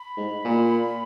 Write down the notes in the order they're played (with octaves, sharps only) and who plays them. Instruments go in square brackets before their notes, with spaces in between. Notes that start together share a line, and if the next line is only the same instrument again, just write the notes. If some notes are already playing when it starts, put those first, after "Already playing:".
Already playing: [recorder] B5
[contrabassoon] G#2
A#2